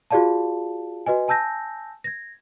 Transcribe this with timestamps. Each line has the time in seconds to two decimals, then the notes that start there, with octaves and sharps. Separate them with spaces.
0.11 F4 F#4 G#4 D5 F5 A5
1.06 F#4 B4 D#5 G#5
1.28 G#5 A5 E6 G6 A#6
2.04 G#6 A#6